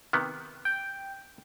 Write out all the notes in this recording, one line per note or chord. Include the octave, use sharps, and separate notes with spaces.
C3 D#3 B3
G5